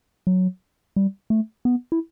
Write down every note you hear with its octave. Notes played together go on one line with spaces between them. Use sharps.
F#3
G3
A3
B3
E4